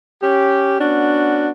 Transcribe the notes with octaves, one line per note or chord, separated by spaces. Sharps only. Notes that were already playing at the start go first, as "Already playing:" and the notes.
C#4 G4
B3 C#4 D4 F#4